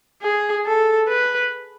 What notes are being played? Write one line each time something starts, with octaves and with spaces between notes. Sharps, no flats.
G#4
A4
B4